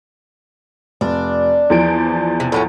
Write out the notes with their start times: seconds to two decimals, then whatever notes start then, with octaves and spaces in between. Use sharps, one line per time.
1.01 F1 D4
1.70 E2 F3 D7
2.40 C3
2.52 A2 F#3 C#4